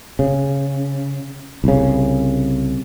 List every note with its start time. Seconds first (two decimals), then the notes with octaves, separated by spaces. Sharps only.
0.19 C#3
1.64 C2 C#3